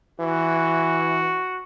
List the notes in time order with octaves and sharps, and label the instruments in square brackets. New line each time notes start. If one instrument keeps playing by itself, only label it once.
[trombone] E3 [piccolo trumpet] F#4